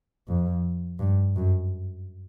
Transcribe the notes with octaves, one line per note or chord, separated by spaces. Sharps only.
F2
G2
F#2